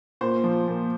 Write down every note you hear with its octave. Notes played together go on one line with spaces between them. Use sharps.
A#2 C5
F3
A#2